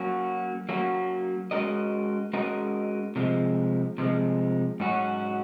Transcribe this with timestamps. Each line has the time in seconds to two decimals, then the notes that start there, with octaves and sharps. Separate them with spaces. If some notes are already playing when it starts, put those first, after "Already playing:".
Already playing: F#3 A#3 C#4 F#4
0.69 F#3 A#3 C#4 F#4
1.51 G#3 C#4 F#4 A#4 D#5
2.33 G#3 C#4 F#4 A#4 D#5
3.16 C3 F3 G#3
3.98 C3 F3 G#3
4.80 G#2 F#3 C#4 F#4